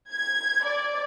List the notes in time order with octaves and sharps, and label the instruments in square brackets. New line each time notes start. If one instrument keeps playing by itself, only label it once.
[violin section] G#6
D5